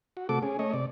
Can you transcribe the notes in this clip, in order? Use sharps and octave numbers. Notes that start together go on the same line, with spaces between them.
F#4
C3 A3 F#4 A4 D6
C#4 G#4
A3 C#5 D#5
C3 D5